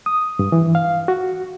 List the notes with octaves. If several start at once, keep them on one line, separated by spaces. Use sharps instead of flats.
D#6
G2
E3
F5
F#4